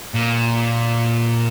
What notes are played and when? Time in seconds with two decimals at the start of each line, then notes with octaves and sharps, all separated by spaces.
0.14 A#2